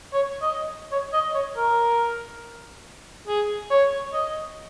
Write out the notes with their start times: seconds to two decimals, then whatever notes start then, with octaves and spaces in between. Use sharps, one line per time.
0.13 C#5
0.42 D#5
0.91 C#5
1.13 D#5
1.34 C#5
1.56 A#4
3.27 G#4
3.70 C#5
4.13 D#5